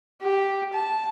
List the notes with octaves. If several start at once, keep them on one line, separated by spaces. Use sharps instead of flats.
G4
A5